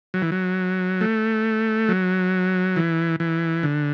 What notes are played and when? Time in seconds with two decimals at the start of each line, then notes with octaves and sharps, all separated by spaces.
0.14 F#3
0.22 E3
0.32 F#3
1.01 A3
1.89 F#3
2.76 E3
3.20 E3
3.63 D3